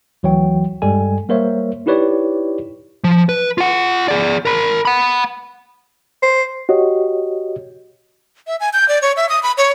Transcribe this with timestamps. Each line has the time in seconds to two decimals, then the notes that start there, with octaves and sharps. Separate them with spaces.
0.23 D2 E3 F#3 C#5 G5
0.82 G2 G3 G#3 A4 G#5
1.29 G3 A#3 A#4 C5 C#5 E5
1.86 D#4 E4 G4 B4 C#5 D5
3.04 F3
3.29 B4
3.58 F4 F#5
4.08 G#4 D5
4.45 A#4 B5
4.85 F#5 B5
6.23 C5
6.69 F#4 G4 C#5 D#5
8.47 E5
8.60 G#5
8.73 G6
8.89 D5
9.02 C#5
9.17 E5
9.29 D#6
9.43 B5
9.58 C#5